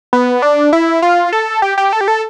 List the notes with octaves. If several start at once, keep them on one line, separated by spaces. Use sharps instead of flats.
B3
D4
E4
F4
A4
G4
G4
A4
G4
A4